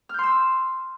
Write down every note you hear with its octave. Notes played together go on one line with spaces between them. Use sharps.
C6 E6 F6 G6